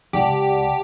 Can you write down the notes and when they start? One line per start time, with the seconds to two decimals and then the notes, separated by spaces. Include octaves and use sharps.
0.13 C#2 G4 D5 F#5 A5